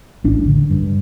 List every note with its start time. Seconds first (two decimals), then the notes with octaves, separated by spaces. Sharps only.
0.24 A1 D4
0.48 D3
0.70 G2